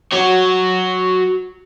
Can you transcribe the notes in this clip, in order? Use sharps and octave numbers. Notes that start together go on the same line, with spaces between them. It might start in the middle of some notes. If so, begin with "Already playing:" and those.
F#4 C#5